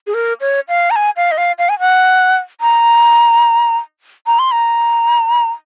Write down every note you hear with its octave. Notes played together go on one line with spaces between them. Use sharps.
G#4
A#4
C#5
F5
A#5
G#5
F5
D#5
F5
F5
G#5
F#5
A#5
A#5
C6
A#5